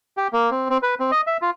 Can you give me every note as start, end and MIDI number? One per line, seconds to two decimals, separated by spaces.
0.17 0.28 67
0.33 0.50 58
0.51 0.69 60
0.70 0.78 60
0.83 0.95 71
0.99 1.11 60
1.11 1.21 75
1.27 1.37 76
1.42 1.50 65